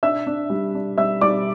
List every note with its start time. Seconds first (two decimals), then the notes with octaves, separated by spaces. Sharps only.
0.03 D4 E5 E6
0.27 D4
0.50 G3
0.75 D4
0.98 G3 E5 E6
1.21 G3 D5 D6